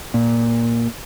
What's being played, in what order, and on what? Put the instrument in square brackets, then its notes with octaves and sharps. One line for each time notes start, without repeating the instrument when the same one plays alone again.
[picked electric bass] A#2